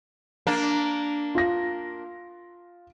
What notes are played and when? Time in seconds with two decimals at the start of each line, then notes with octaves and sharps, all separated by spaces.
0.47 A#3 D4
1.35 F4 A#6